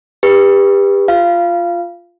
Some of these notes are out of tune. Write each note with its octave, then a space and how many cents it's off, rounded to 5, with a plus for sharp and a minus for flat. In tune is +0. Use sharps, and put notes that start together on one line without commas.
G4 +30 B4 -15
F4 +0 F5 -20